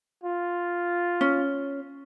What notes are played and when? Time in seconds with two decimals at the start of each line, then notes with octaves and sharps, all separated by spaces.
0.24 F4
1.21 C#4